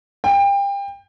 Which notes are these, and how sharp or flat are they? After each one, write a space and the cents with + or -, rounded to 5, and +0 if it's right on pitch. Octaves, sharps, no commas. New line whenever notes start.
G5 +30